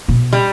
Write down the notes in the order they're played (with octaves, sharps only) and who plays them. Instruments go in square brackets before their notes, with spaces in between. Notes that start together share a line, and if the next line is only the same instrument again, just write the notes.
[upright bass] B2
[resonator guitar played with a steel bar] G3